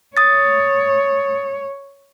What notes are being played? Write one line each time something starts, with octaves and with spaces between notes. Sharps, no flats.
C#5 D#6 A6